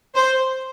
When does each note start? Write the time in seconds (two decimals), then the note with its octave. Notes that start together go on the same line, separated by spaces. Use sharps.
0.15 C5